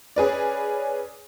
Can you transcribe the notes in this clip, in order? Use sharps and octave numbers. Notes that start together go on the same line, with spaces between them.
C#4 G#4 B4 D5